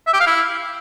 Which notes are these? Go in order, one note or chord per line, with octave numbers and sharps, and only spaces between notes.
E5
G4
F5
E4